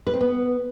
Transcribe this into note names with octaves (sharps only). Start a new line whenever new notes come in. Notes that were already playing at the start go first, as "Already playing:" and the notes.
B4
C4
B3